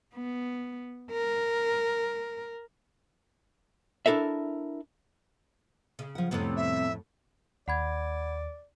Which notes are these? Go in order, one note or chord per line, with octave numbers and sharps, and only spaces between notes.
B3
A#4
D4 E4 A4 A#4 E5
C#3
F3 F#5
F2 A2 C3 G3 B3
E5
D#2 D5 F#5 B5 G#6